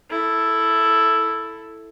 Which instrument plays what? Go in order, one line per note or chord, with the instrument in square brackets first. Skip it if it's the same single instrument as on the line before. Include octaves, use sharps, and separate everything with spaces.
[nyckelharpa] E4 A4